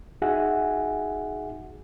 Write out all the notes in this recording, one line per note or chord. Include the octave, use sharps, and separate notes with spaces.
D#4 F#4 G#4 E5 F#5 G#5